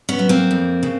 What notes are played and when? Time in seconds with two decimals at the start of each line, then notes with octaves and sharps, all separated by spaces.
0.09 B3 C#4
0.19 F#3
0.29 A#3 C4
0.51 F2
0.83 C#3